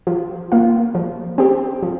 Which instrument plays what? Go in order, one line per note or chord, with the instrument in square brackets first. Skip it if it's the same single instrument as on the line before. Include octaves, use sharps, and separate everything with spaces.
[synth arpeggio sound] F3
A#3 F4
F3
C4 G4
F3